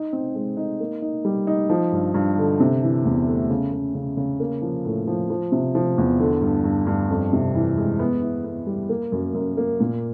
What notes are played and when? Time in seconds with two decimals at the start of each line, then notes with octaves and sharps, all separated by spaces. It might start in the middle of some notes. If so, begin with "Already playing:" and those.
Already playing: D#4
0.13 C4
0.35 G#3
0.57 D#4
0.80 A#3
1.02 D#4
1.25 G3
1.47 D#4
1.70 F3
1.92 G2
2.14 G2
2.38 D3
2.60 C3
2.83 E3
3.05 E2
3.27 A3
3.50 C#3
3.73 C#3
3.95 C#3
4.17 C#3
4.40 A#3
4.62 F3
4.85 A2
5.07 F3
5.30 F3
5.52 C3
5.75 F3
5.98 E2
6.20 D3
6.42 G2
6.64 G2
6.87 G2
7.10 F2
7.33 C3
7.55 E3
7.77 G#3
7.99 B3
8.22 E4
8.45 B3
8.67 G3
8.89 A#3
9.12 F#2
9.34 F#2
9.57 A#3
9.80 A#2